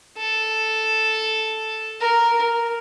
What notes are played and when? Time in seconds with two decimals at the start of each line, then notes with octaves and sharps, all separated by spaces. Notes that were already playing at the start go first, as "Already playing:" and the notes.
0.18 A4
2.00 A#4